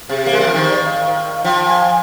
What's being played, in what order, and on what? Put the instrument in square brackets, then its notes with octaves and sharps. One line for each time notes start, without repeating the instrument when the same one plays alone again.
[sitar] C3 [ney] G#4
[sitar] A#3
[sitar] G#3 [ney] A#4
[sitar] G3
F3
D#3
[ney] C5
D5
F5
[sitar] F3 [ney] G5
[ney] G#5